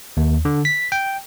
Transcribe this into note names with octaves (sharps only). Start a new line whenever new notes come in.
D#2
D3
B6
G5